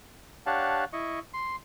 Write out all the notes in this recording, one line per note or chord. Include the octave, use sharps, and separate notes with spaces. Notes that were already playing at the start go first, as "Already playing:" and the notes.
D4 G4 C#5 F5 F#5 A5
E4 D#5 C#6
C6